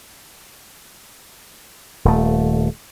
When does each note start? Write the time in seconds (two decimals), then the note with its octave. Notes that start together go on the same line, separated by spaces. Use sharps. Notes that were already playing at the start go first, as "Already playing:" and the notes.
2.05 D#1 A3